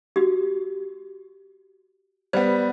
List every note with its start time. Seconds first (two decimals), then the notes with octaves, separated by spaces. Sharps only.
0.16 F#4 G4
2.33 G3 B3 C5